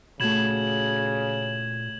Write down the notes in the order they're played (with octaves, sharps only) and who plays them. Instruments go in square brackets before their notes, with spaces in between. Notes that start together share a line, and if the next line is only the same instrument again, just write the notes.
[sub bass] A#2 [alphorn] C#3 [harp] A3 F#4 B5 [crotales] G#6 E7 F#7